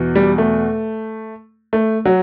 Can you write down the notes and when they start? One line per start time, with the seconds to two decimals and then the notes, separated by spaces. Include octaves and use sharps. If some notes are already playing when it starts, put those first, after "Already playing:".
Already playing: E2 B2
0.15 G3
0.38 A3
1.73 A3
2.05 F#3